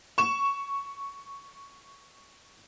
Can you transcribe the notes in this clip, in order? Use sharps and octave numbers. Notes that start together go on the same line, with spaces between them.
C#6 E7